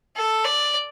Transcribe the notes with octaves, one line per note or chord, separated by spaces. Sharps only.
A4
D5